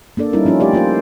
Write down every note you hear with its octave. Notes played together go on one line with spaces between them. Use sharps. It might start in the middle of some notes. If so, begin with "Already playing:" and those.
A#3 D4 A4 D5
G3 C#4 D#4 E4 A#4
F3 C#4 D#4 F4
A3 G4 D5 E5
A#3 F4 A#4 C5